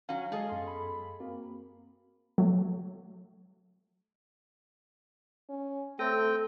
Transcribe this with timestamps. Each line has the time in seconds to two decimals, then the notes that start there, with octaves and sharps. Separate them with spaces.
0.09 F#3 C#4 F5
0.32 G#3 G#4 A4 D#5
0.49 F#2 B3 C6
0.67 B5
1.20 A#3 C4 F#4 A#4
2.38 F#3 A3
5.49 C#4
5.99 A3 C4 A4 G5